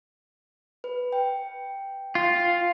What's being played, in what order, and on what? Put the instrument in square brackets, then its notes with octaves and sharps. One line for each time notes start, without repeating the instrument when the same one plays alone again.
[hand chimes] B4
G5
[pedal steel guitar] F4